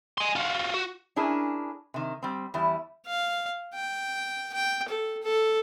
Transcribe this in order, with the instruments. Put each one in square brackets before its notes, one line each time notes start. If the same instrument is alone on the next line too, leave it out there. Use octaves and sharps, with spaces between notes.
[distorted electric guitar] G#5 C6
F4 F#4
F#4
[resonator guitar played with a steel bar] C#4 D4 E4 G#4 A#4
C3 D#3
G3 C4
E2 G3 E4
[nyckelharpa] F5
G5
G5
A4
A4